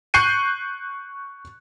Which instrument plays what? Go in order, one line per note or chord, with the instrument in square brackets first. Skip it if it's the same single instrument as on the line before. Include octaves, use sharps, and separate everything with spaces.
[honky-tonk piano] C#6 F#6 G6 C7 C#7 D#7